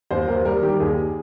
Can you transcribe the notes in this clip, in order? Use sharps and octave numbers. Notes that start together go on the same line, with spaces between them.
D#2 C5
D#2 A#4
G3 A#4
D#3 G4
D#2 G#4